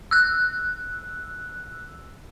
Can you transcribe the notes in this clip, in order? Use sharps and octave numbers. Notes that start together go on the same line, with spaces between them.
E6 F#6